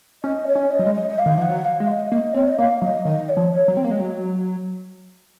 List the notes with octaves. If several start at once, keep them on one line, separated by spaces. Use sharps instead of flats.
C#4 D#5
C#5
C#4
D#5
F#3
G#3
D#5
D#5
F5
D#3
F3 F#5
F#3
F5
G#3
D#5
A#3 D#5
C4 C#5
D#5
A#3 F5
F#3 D#5
D#3 D#5
C#5
F3
C#5
F#3
C4
A#3
G#3
F#3